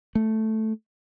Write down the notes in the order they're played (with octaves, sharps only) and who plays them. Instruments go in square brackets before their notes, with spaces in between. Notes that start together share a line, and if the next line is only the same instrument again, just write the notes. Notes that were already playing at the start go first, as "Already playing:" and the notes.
[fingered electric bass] A3